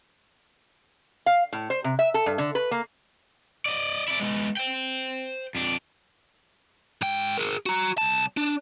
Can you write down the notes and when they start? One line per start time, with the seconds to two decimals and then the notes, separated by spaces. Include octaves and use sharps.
1.26 F5
1.53 A2
1.70 C5
1.84 C3
1.99 E5
2.14 A4
2.26 G2
2.38 D3
2.55 B4
2.71 A#3
3.66 D5 D#5
4.08 E4 D5
4.20 G#3 B3
4.57 C5 G5
5.55 F2 D4
7.01 G#2 G5
7.38 G#4 A#4
7.66 F#4 A#5
7.98 C2 A5
8.37 D4